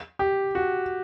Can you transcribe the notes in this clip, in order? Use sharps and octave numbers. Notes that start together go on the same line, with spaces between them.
G4
F#4